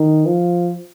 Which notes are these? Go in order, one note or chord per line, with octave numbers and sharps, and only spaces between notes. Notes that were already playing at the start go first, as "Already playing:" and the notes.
Already playing: D#3
F3